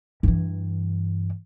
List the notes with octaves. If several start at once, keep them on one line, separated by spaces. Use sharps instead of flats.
G2 E3